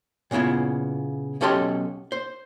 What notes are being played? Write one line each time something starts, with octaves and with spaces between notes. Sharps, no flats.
A#2 C#3 B3 E4 F4
B1 C#4 G4 A4 D#5 C6
C5